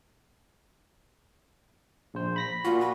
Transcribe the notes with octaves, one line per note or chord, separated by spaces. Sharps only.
A#1 C5
B5 A#6 B6
A#2 F4 F#4
B5